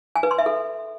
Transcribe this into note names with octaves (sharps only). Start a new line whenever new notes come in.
G#5
B4
C6
E5
A4